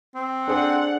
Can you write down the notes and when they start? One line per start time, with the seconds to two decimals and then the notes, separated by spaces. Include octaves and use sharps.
0.15 C4
0.48 D4 G#4 A4 C5 D5 F#5